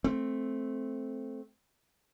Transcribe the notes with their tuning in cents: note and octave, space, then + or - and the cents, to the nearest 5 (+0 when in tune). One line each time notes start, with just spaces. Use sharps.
A3 -10 C4 +0